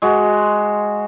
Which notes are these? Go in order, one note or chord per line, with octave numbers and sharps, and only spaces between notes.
G#3 F#4